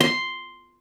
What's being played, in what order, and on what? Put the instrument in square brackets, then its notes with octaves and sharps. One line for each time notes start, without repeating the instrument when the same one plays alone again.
[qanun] C6